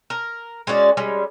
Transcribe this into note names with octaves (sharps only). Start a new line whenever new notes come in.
A#4
G#3 C#4 F#4 D5
G3 G#3 C#4